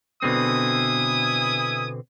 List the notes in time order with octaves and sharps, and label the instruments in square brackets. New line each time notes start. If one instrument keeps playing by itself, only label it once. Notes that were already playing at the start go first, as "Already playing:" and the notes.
[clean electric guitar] B2 D3 C4 [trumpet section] E4 G#5 D#6